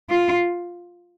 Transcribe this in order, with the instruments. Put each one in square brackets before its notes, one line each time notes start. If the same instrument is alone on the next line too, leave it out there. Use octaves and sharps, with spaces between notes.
[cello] F4